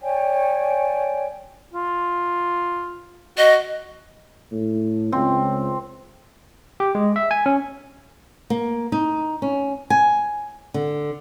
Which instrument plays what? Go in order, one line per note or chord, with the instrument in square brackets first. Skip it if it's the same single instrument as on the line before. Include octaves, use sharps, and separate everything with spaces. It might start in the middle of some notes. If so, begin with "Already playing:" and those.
[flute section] C#5 D5 G5 G#5
[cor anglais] F4
[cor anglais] F#4 [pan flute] D#5
[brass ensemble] A2
[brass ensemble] C#2 [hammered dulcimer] C4
[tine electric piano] G4
G#3
E5
G#5
C#4
[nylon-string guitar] A#3
D#4
C#4
G#5
D3